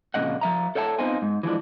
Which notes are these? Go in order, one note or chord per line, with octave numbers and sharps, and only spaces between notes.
F2 A#2 C#3 G#3 D#5 F#5
F3 E5 A#5
A4 C#5 E5 F#5 A5
B3 C4 D#4 F4 C5 G#5
G#2
E3 F3 G#3 D4